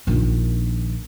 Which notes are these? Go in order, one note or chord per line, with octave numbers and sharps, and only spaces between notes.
A#1 D#3